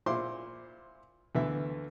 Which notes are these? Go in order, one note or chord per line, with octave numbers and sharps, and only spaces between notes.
A#2 E4 C5 C6 D6
D2 D3 E3 B3 E5